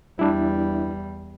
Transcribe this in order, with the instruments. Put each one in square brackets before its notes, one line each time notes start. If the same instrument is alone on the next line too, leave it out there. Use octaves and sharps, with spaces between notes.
[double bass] E2 G3 [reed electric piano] D4 E4